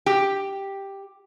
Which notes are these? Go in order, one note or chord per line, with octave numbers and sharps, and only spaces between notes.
G4